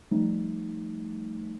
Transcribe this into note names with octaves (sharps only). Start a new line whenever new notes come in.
F3 G3 A3 D#4